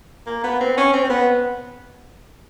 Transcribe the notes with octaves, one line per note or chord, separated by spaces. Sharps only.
A#3
B3
C4
C#4
C4
C4
B3